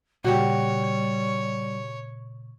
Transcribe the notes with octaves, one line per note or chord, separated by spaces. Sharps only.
A#2 C#3 G3 F#4 G4 C#5